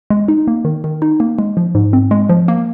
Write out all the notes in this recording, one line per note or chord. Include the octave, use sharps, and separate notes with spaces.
G#3
D#4
A#3
D#3
D#3
D#4
A#3
G#3
F3
G#2
C4
G#3
F3
A#3